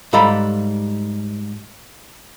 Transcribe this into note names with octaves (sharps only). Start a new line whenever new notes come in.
G#2 G3 A4 F5 A#5 B5